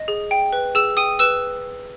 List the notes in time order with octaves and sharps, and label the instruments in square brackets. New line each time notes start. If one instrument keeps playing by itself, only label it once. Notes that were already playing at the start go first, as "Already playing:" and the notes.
Already playing: [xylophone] D#5
G#4
G5
B4
G#4 E6 E7
G5 D#6 D#7
B4 E6 E7